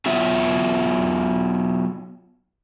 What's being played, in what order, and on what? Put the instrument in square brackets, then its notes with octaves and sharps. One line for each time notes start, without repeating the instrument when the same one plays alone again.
[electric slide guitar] F#3 B3 F4 E5